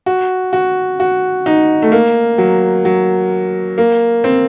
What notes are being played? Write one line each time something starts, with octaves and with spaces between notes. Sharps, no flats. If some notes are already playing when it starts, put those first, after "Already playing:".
F#4
F#4
F#4
D#4
A3
A#3
F#3
F#3
A#3
C4